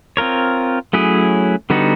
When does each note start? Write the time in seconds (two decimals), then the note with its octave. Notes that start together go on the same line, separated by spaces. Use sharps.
0.17 C4 F4 A#4 C#5
0.93 F#3 A3 C#4 E4 G#4
1.70 D3 G3 B3 D#4 F#4